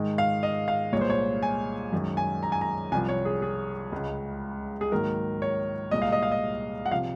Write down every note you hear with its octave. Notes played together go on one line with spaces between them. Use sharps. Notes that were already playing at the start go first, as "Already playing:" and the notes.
Already playing: G#2 D#3 G#3
F5
D#5
F5
C2 A#2 G#3 C#5
C5
C#5
G#5
F#2 D#3 G#3
G#5
A#5
G#5
A#5
C2 C3 F3 G#5
C#5
G#4
G#4
C#2 C#3 G#3
G#4
G#2 D#3 F#3 A#3 A#4
C#5
C2 A#2 G#3 D#5
F5
D#5
F5
D#5
F#5
C3 F3 F5